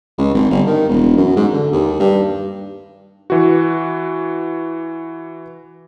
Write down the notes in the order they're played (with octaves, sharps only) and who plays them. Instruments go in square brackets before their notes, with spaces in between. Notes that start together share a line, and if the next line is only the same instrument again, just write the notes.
[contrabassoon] C#2
G#1
G1
D#3
E1
F#2
G#2
D3
D#2
G2
[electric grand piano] E3 F#4